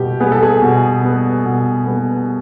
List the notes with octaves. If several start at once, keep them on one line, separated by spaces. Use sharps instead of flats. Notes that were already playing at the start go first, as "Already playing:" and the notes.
Already playing: B2 G3 B3 G4
G3 B3 G#4
A4
G#4
B2
G3 B3
B2
G3 B3